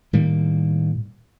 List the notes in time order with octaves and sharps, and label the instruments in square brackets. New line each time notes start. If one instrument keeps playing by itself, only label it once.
[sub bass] A2 [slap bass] D#3 G3 A#3